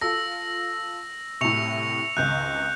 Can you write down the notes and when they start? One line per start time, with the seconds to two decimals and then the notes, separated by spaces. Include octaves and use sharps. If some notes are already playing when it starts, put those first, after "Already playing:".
0.01 F4 A4 E6 A#6
1.41 C2 A2 C#6 C#7 F7
2.17 G#1 C#2 F#6 G6